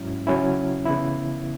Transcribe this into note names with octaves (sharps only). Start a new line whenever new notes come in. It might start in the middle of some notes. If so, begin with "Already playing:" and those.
Already playing: G#2 F#3 C#4 E4
C#3 F#3 C#4 E4
C#3 E3 B3 E4